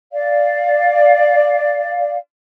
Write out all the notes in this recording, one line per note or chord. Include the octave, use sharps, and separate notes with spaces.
D5 F5